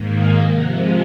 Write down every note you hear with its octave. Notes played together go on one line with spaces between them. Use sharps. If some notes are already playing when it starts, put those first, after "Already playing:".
Already playing: G#2 D#3 A#3
F5 G#5
C3 F3 G#3 F#5 A#5